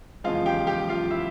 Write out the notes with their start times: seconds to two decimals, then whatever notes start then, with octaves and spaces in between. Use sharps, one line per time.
0.24 E2 C#3 F3 G#3 F4 F5
0.46 G4 G5
0.67 G4 G5
0.89 F4 F5
1.11 E4 E5